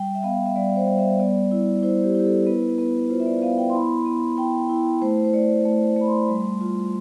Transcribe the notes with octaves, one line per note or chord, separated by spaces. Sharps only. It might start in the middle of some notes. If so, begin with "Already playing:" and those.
Already playing: G3 G5
E5
B3 F5
E5
G3 D5
C5
G3
E5
B3 D5
E4
E4 C5
G4
E4 G4
A4
B3 B4
B3 B4
F4 C5
E5
D5
B3 F5
G5
C6
E4 B5
B3
E4 G5
E4
A3 C5
C5
A3 D5
A3 C5
A3 B5
C6
G3
F4